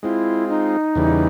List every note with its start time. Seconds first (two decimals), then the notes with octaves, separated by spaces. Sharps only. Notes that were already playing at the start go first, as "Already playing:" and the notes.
0.03 G#3 C4 E4 F4
0.49 D#4
0.95 E2 C#3 E3 G3